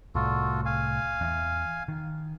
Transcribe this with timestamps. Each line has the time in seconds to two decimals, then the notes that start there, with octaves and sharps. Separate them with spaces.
0.15 C2 A2 F4 F#4 A4
0.65 F5 G#5
1.21 E2
1.88 D#3